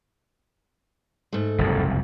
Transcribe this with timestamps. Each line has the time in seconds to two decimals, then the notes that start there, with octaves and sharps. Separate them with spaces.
1.33 G#2 A3
1.59 F#1 C2 F2